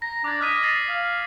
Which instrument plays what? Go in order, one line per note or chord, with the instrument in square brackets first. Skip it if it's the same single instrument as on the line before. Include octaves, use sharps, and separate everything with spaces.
[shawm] A#5 [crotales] A#6
[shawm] D4 [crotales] D6 G#6
[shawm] D#5 [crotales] F6 B6 D#7
[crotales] D#6 A6 C7
[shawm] F5